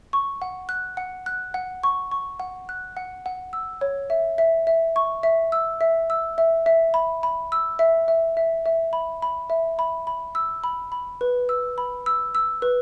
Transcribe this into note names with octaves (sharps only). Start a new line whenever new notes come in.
C#6
F#5
F#6
F#5
F#6
F#5
C#6
C#6
F#5
F#6
F#5
F#5
E6
C#5
E5
E5
E5
C#6
E5
E6
E5
E6
E5
E5
B5
B5
E6
E5
E5
E5
E5
B5
B5
E5
B5
B5
E6
B5
B5
B4
E6
B5
E6
E6
B4